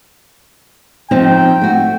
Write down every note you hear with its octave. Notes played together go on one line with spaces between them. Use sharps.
F3 C4 D#4 G5
A3 F#4